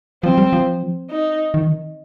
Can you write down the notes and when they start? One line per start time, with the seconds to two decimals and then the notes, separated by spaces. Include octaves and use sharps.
0.23 F3 C4
0.38 G3
0.53 F3
1.10 D#4
1.54 D#3